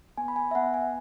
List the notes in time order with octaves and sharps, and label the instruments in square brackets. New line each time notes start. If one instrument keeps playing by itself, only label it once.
[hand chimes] B3 G#5
B5
G#5
E5
B3 F#5
G#5